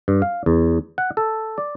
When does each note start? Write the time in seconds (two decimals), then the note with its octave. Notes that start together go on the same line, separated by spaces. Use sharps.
0.08 G2
0.22 F5
0.46 E2
0.98 F#5
1.17 A4
1.58 D5